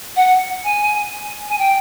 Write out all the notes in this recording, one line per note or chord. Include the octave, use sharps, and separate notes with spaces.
F#5
G#5
G#5
G5